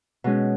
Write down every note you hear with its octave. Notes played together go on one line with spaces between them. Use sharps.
B2 G#3 C#4